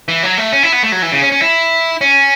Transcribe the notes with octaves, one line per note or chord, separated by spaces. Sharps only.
E3
F#3
A3
C#4
E4
B3
A3
F#3
E3
C#3
C#4
C#4
E4
C#4